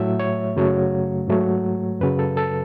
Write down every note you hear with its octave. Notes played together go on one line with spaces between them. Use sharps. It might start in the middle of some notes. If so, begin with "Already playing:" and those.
Already playing: A2 F#3 A3 E5
C#5
F#2 C#3 F#3 A3
G#2 F#3 A3
F#2 C#3 F#3 B4
A4
A4